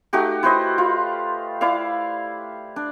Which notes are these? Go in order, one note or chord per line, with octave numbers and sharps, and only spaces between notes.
A3 D#4 F#4 G4
E4 B4 C5 D#5
F4
E4 D5 F5
D4